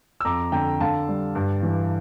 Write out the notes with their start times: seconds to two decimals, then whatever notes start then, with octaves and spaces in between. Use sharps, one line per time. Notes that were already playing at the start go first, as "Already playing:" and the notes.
0.21 E6
0.25 F2 A#5 D6
0.52 D3 G5 A#5
0.81 D3 F5 A5
1.09 G3
1.35 G2
1.63 E3